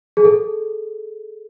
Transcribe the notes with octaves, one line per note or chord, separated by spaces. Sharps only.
G#4
A4